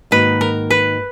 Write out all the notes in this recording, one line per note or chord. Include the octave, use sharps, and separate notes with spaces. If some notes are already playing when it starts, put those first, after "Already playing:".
G#2 D#3 A#3 D#4 F#4 B4
A#4
B4